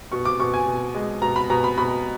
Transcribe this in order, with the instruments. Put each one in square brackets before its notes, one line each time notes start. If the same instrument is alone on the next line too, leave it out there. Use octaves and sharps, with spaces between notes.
[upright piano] B2 C#6
D6
B2 C#6
G#5
B2
G#3
B2 A#5
B5
B2 A#5
B5
B2 B5